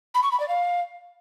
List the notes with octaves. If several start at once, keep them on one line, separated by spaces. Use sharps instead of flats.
B5
C#6
B5
D5
F5